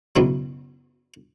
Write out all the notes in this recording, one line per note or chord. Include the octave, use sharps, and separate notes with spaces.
C#2 F#2 B2 E3 F#3